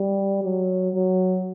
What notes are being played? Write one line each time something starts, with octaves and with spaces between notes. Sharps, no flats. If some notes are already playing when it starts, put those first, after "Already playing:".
Already playing: G3
F#3
F#3